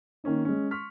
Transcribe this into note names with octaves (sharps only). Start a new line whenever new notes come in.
D#3 A#3 C#4 D#4
G#3 C#4
C6 C#6 F6 B6